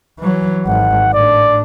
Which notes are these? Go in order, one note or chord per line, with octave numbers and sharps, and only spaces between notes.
E3 F#3
G#1 F#5
A2 D4 D5